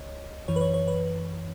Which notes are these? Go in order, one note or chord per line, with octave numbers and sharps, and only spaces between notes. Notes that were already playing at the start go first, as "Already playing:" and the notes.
Already playing: C#2 C#5 D#5
F#2 E3 C#5
B4
C#5
C#5
B4